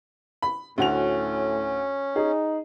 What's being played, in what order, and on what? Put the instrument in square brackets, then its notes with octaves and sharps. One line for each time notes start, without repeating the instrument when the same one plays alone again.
[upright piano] B5
[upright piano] D2 F#4 F7 [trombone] A2 [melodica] C#4
[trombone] D#4 [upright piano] G#4